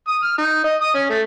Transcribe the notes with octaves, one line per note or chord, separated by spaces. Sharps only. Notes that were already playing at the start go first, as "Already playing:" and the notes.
D#6
F6
D#4
D#5
D#6
C#4
A3